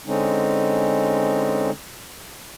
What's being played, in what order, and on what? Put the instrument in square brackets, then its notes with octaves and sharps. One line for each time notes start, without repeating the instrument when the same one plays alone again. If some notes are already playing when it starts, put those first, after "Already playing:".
[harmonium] D3 G#3 C4 C#4 D#4